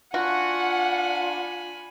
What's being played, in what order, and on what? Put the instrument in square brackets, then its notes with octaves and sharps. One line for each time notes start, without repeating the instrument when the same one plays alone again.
[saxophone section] D4 F4 [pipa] F#4 [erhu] F#5 [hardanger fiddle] G#5 B5